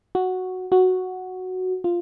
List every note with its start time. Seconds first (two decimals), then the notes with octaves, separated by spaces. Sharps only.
0.15 F#4
0.72 F#4
1.84 F4